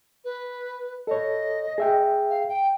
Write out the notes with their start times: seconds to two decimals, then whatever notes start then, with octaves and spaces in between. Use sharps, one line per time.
0.24 B4
1.07 A4 C#5 D#5
1.78 G#4 E5 G5
2.30 F5
2.48 G5